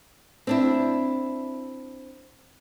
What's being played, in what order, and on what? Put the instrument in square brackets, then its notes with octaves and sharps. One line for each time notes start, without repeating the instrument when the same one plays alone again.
[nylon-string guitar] C4 D4 E4